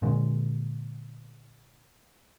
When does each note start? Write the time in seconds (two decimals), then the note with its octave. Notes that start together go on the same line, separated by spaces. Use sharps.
0.02 A#2 D3 G#3